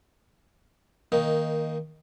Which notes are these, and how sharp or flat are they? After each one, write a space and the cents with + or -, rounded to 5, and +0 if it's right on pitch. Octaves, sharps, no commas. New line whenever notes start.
D#3 +15 A#3 +0 D#4 +0